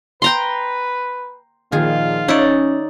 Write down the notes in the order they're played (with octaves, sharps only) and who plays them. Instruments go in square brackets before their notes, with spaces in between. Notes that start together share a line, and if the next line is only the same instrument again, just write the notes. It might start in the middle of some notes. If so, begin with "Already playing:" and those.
[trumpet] B4 [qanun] G5 A#5 C6
[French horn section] A#2 F3 A#3 [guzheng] D#3 G#4 [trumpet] F4
[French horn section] C#4 [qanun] D#4 D5 [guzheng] C#5 E5 F#5